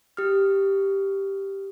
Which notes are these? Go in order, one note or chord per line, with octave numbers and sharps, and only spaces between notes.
G4 D#6 F6